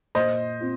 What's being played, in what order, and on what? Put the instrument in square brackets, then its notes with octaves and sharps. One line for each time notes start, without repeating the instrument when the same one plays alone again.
[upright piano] A#2 [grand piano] C5 D#5
[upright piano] C4 F4